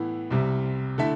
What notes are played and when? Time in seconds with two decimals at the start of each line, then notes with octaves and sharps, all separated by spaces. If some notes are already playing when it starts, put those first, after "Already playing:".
Already playing: A2 E3 B3 E4
0.31 C2 C3 G3
0.98 D3 A3 E4 A4 E5